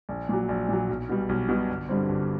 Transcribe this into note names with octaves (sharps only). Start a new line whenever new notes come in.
A#1
A#2 F#3
A#1
A#2 F#3
B1
B2 G3
B1
B2 G3
G1
G2 D3 G3 C4
G1